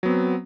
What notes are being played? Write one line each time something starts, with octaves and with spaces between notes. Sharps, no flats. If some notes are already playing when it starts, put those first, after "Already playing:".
F#3 B3 C4